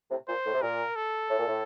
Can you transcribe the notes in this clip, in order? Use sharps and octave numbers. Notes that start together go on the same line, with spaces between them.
A2 C3
A#2 C5
A2
C3
A#2 A#4
A4
A2
A#2
A2